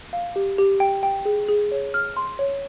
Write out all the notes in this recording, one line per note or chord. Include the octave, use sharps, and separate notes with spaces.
F5
G4
G4
G5
G5
G#4
G#4
C#5
F6
C6
C#5